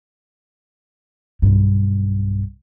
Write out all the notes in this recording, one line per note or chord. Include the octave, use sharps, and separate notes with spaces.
B1 G2